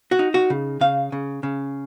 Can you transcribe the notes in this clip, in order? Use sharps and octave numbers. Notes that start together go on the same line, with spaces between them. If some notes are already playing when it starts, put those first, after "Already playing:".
F#4
D#4
F#4
C#3
C#3 F5
C#3
C#3